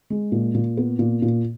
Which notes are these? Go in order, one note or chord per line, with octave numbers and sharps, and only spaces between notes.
G#3
A#2
A#2
B3
A#2
A#2